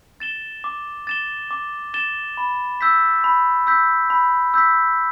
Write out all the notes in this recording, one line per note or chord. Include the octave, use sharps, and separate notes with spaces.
A6 E7 G7
D6
A6 E7 G7
D6
A6 E7 G7
B5
E6 G6 B6
B5
E6 G6 B6
B5
E6 G6 B6